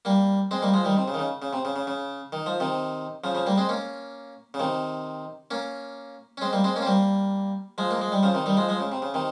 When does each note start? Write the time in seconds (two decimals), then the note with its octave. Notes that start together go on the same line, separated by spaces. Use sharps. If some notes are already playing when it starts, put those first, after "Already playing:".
0.05 G3 A#3
0.51 G#3 C4
0.62 G3 A#3
0.74 F3 G#3
0.85 D#3 G3
0.97 C3
1.08 C#3
1.14 D#3
1.19 C#3
1.42 C#3
1.53 C3
1.65 C#3
1.76 C#3
1.87 C#3
2.32 D#3
2.46 F3
2.60 C3 D#3
3.24 C#3 F3
3.35 C#3 F3
3.46 G3 A#3
3.57 G#3 C4
3.69 A#3 C#4
4.54 C#3
4.60 C3 D#3
5.51 A#3 C#4
6.37 C#4
6.42 G#3 C4
6.53 G3 A#3
6.64 G#3 C4
6.76 A#3 C#4
6.82 C4
6.86 G3 A#3
7.78 F3 G#3
7.91 A#3
8.02 G#3
8.12 G3
8.23 C#3 F3
8.34 C3 D#3
8.46 D#3 G3
8.57 F3 G#3
8.69 F3 G#3
8.80 C#3
8.92 C3
9.02 C#3
9.14 C3 D#3